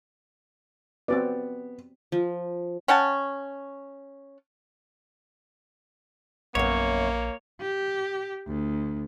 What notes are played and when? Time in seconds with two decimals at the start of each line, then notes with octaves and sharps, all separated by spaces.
1.08 B3 C4 F#4 D5
2.12 F3
2.88 C#4 F#5 G5 A5
6.55 A#1 F#2 A#3 B3 C#5
7.61 G4
8.47 D2